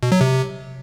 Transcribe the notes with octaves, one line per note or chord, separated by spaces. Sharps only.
B2
F#3
C3